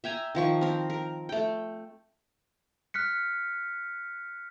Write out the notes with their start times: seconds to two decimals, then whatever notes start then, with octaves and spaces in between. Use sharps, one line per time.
0.04 E5 G5 G#5 A#5
0.35 D#3 F3 C#6
0.61 C4 A#4
0.90 A#4
1.29 A3 G5
2.94 F6 F#6 B6 C#7